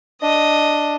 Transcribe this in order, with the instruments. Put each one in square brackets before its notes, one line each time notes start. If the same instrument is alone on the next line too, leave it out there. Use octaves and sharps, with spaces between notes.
[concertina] D4 [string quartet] D#5